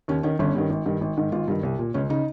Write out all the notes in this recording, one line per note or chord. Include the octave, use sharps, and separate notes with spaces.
D#2 C#4
D#3 C#4
G1 C#4
G2 D#3
G#1
G2 D#3
G#1
G#2 D#3
G#1 F4
G2 D#3
C2
A#2
C#2 C#4
C#3 D#4